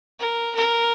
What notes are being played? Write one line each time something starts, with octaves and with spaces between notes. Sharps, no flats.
A#4
A#4